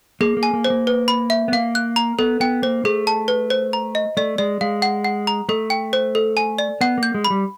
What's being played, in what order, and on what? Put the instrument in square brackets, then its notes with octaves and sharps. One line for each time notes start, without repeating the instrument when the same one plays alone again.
[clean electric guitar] A#3 [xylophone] G#4
[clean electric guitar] A#3
[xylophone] G#5
[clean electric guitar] A#3
[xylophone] C5
[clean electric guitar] A#3
[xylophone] B4
B5
E5
[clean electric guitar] B3
[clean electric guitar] A#3 [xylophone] F5
[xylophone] F#6
A#5
[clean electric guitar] B3 [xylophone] A4
[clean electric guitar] B3 [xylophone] G5
[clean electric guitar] A#3 [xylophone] C5
[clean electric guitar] A3 [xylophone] G#4
[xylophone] A5
B4
C5
A#5
D#5
[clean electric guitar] A3 [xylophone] D5
[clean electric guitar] G#3 [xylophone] D5
[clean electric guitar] G#3 [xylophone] F5
[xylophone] F#5
F#5
A#5
[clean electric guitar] A3 [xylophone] A4
[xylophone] G5
C5
A4
G#5
D5
[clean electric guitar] B3 [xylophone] F#5
[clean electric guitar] A#3
[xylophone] G6
[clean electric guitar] G#3
[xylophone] B5
[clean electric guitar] G3